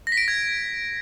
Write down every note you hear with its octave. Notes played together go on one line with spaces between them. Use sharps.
A#6
B6
D7
B6
G#6